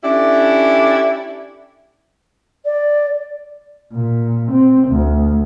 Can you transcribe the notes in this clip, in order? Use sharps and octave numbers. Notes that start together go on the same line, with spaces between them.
C#4 D4 E4 G4 A4
D5
A#2
C4
D2